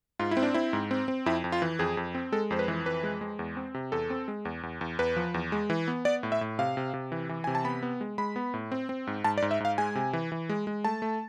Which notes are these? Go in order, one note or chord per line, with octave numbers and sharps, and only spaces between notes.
G#2 F4
E4
C4
D4
C4 E4
G#2
C4
C4
F2 E4
F2
F4
E3
F2 G#4
F2
C4
G#3 A4
F2 C5
B4
E3
F2 B4
G#3
G#3
E2
C4
C3
E2 A4
C4
G#3
E2
E2
E2
E2 B4
F3
E2
G#3
E3
B3
B3 D5
A2
E5
A2
C3 F5
C3
C3
E3
E3
C3 G#5
A5
B3 B5
B3
G#3
G#3 B5
B3
A2
C4
C4
G#2
G#2 A5
D5
G#2
E5
G#2 F5
G#3 G#5
C3
E3
E3
G#3
G#3
A3 A5
A3